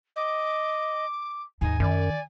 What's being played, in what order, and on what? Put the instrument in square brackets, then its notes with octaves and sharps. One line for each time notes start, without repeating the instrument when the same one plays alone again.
[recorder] D#5 [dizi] D6
[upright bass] D#2 G#2 [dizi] D#4 [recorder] G#5
[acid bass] F#2 [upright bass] D#3 [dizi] D5